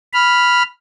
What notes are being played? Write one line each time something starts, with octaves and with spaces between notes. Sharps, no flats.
B5 F6